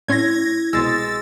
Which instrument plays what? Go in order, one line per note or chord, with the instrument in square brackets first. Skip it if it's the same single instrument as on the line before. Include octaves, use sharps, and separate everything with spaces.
[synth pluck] A2 C#4 C6 [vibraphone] E4 [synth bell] G#6 A#6
[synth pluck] C2 B2 [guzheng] G#3 [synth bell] E6 A6